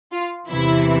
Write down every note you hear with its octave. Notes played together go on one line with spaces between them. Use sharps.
F4
E2 C3 E3 E4